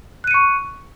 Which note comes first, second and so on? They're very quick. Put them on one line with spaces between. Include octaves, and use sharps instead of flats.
F#6 D#7 C#7 C#6